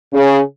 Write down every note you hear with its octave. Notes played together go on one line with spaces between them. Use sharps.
C#3